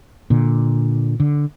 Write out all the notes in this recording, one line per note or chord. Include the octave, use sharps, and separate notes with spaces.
A#2 D3
D3